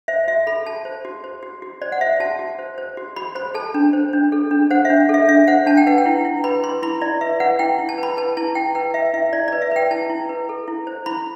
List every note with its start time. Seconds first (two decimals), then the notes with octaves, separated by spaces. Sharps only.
0.08 C5 E5
0.28 F#4 E5
0.47 A4 B5
0.66 F#4 A5
0.85 C5
1.05 F#4
1.24 C5
1.43 F#4
1.62 F#4
1.82 C5 D5
1.92 F#5
2.01 C5 E5
2.20 F#4 A5
2.39 F#4
2.59 C5
2.78 C5
2.97 F#4
3.16 F#4 B5
3.35 C5 B5
3.54 A4 A5
3.74 D4
3.93 C5
4.13 D4
4.32 A4
4.51 D4
4.71 C5 F#5
4.85 E5
4.90 D4
5.09 A4 E5
5.28 D4 E5
5.48 C5 F#5
5.66 D4 A5
5.77 G5
5.87 B4 F#5
5.98 G5
6.06 E4
6.25 E4
6.44 B4 B5
6.63 B4 C6
6.82 E4 B5
7.01 E4 D5
7.21 B4 E5
7.40 B4 F#5
7.59 E4 G5
7.79 E4
7.89 A5
7.98 B4
8.03 B5
8.17 B4 A5
8.37 E4 A5
8.55 E4 G5
8.75 B4 G5
8.94 B4 E5
9.13 E4 E5
9.33 E4 D5
9.48 B4 D5
9.62 E5
9.71 B4 G5
9.91 E4 A5
10.10 E4
10.29 B4
10.49 A4
10.68 E4
10.87 C5
11.06 E4 B5